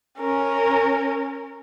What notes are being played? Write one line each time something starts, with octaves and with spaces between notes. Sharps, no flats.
C#4 A#4